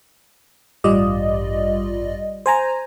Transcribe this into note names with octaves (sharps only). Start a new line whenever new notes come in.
A1 G2 G3 F4 D5 D#5
C5 G#5 A#5